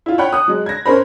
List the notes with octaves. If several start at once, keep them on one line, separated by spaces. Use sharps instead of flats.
E4 F4
C#5 F#5 G5 B5 F#6
D#6 F#6
F#3 G#3
G#6 A#6
C#4 A#4 C5 B5